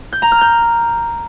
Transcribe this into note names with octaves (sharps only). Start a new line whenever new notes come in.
G6
A#5
F6
G6